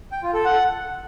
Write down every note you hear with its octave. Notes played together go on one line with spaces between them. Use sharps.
G5
F4
A4
F#5